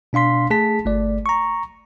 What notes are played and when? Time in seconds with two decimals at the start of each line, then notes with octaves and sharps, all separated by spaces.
0.13 B2 D4 F5 C6 B6
0.50 A3 G#4 A5 B6
0.85 G1 A3 D5
1.26 A#5 C#6